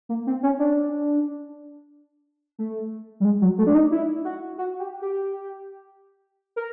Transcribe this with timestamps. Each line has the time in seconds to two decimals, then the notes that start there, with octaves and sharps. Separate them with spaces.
0.09 A#3
0.27 C4
0.43 C#4
0.59 D4
2.59 A3
3.20 G3
3.25 G#3
3.41 F#3
3.58 A3
3.67 D4
3.75 D#4
3.91 E4
4.25 F#4
4.58 F#4
4.80 G4
5.02 G4
6.56 A#4